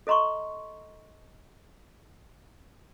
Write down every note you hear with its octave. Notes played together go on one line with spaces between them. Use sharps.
A4 D#5 A#5 C6 C#6